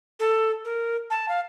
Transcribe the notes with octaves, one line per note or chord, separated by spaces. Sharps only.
A4
A#4
A5
F5